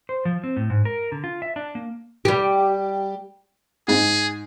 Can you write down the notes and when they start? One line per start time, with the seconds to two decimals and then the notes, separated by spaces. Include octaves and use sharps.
0.09 C5
0.25 F3
0.44 C4
0.57 A2
0.70 G#2
0.85 A#4
1.12 D3
1.24 F4
1.42 E5
1.56 D4
1.75 A#3
2.25 G3 G4
3.88 G#2 G#4